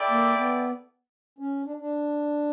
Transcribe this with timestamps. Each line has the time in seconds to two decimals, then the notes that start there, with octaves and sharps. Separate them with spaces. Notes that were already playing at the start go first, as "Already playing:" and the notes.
Already playing: E4 A4 D5 G5
0.09 A#3
0.35 B3
1.39 C#4
1.64 D4
1.80 D4